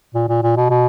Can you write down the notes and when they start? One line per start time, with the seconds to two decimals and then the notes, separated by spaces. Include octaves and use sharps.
0.15 A#2
0.28 A#2
0.43 A#2
0.56 B2
0.70 B2